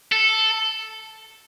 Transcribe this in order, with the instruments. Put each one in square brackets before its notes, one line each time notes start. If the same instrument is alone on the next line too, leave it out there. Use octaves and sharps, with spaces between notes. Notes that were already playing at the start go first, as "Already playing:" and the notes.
[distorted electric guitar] A4